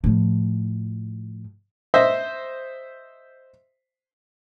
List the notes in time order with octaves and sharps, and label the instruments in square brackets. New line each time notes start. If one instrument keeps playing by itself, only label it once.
[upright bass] A2 F3
[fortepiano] C5 D#5 E5